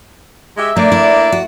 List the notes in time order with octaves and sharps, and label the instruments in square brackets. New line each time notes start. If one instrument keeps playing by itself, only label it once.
[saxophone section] G#3 G4 E5
[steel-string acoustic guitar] A3 [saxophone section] A#3 D4 D5
[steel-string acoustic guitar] E4
F#4